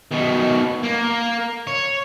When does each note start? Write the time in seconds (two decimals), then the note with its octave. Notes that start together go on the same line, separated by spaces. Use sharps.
0.11 B2 D#3
0.83 A#3
1.67 C#5